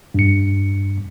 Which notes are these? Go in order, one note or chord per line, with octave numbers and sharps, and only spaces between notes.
G2 C#7